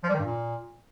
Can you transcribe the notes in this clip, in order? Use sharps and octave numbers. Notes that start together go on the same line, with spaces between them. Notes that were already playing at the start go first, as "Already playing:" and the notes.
F3
G3
D#3
G2
A#2